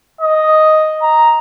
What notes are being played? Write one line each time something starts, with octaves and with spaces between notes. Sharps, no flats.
D#5
A#5